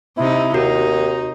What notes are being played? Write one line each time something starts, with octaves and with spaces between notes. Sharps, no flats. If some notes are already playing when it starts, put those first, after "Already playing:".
C3 D#4 E4
D#2 D#4 F#4